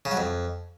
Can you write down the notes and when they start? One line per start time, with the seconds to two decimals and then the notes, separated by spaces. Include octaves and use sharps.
0.05 C#3
0.11 F#3
0.17 F2